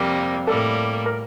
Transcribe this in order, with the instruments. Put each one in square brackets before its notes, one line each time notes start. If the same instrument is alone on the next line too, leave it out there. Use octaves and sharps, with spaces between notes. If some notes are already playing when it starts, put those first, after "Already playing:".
Already playing: [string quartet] F2 C3 G3 A#3 [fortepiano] A#4
[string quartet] A2 G3 A#3 [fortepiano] A4
[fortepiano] A#4